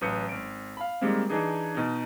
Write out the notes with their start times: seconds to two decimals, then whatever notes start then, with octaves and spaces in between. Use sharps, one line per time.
0.01 A1 F#3 B4 D#6 G6 C#7
0.29 G#1 D7
0.77 F5 B5
1.01 D#3 G3 G#3 A#3 C4
1.29 E3 D4 D#4 G#4
1.75 B2 D#4